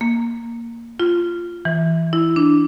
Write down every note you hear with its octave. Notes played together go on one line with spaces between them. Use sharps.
A#3
F4
E3
E4
D4